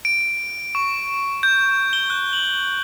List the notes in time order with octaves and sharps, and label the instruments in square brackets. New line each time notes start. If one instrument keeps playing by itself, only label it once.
[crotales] D7
C#6
G6
G7
F#6
F#7